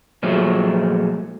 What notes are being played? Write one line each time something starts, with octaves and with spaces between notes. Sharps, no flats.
A#2 F3 F#3 G#3 A3